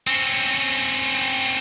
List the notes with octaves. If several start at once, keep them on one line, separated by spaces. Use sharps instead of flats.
C4 C#4